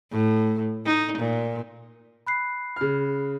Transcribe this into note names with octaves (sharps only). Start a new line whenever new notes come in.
A2
D#4
A#2
B5 F#6 C7
C#3 F6